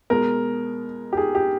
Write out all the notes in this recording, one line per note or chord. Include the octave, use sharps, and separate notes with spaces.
B2 G#3 A#4
G4
G#4
G4